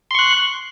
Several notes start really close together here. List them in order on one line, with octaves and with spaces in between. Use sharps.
C6 C#6 F#6